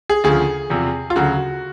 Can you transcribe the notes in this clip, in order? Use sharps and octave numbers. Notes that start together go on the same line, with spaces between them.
G#4
D2 C#3 F3 G#4
E2 C3 F3
F4
D2 C#3 F#3 F#4